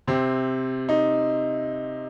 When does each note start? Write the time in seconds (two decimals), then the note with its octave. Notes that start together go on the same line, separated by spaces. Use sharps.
0.07 C3 C4
0.89 D#4